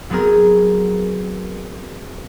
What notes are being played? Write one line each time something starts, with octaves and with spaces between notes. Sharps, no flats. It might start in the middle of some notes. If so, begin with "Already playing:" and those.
F#3 B3 C4 G#4 A#4